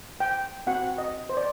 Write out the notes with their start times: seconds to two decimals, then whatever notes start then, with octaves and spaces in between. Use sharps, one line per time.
0.20 G5
0.67 C4 F#4 F#5
0.98 D#5
1.29 C5
1.37 D5